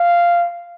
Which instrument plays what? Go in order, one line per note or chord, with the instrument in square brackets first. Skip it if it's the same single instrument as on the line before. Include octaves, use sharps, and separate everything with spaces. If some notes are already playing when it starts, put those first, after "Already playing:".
Already playing: [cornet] F5